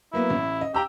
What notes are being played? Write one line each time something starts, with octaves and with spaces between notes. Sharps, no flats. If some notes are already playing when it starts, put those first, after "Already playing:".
F#3 A#3 B3 E4
A1
D#5
G4 G5 A#5 E6